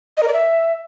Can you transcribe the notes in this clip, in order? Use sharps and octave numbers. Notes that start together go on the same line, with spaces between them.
D#5
A#4
D5
E5